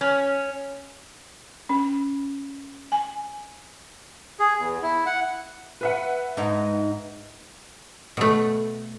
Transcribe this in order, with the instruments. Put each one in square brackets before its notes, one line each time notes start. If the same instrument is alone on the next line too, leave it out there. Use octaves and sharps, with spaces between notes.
[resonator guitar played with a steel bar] C#4
[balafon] C#4
G#5
[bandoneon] G#4
E2
E4
F#5
[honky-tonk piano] B4 E5 F#5
[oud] G#2 D#4
[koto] B2 A3